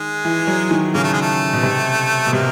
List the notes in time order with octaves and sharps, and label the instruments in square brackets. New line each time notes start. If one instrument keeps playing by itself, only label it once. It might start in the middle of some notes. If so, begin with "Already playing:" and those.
Already playing: [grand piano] D#3 [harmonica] G#3
[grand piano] E3
F#3
D#3
[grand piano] C#3 [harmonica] A#3
[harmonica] A3
G#3
A3
[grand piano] B2
C3
B2
[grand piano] C3 [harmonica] A#3